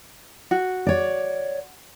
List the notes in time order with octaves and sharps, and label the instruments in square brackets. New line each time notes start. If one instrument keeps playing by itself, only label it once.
[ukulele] F#4
[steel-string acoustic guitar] C#5 D5